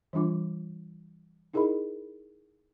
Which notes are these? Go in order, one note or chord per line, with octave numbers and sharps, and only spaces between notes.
E3 G3 D4 F4 D6
D#4 E4 G#4 A#4 D#5 B5